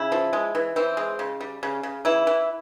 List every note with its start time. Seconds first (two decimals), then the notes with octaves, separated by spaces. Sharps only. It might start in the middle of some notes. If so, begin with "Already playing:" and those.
Already playing: C#3 E4
0.12 F3
0.33 G#3
0.55 E3
0.76 E3 C4
0.97 G#3
1.19 C#3
1.40 G3
1.63 C#3
1.83 C#3
2.05 E3 E4
2.27 E3